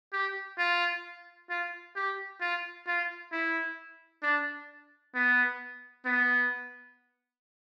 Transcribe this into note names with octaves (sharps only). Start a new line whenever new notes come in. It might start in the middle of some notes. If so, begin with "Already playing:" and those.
G4
F4
F4
G4
F4
F4
E4
D4
B3
B3